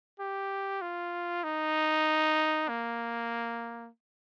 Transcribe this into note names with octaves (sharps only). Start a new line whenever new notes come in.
G4
F4
D#4
A#3